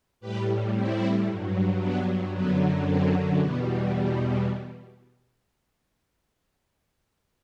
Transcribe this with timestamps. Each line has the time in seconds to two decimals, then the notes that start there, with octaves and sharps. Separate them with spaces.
0.20 A2 G3 G4 B4
0.73 C4 E4
1.27 G2 F#3
1.80 B3 D4
2.33 F#2 D3 F#3 B3
2.86 C4
3.39 E2 B2 G3 B3